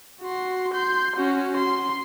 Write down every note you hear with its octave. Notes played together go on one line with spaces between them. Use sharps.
F#4 C6
C6 G6
C#4 F#4
C6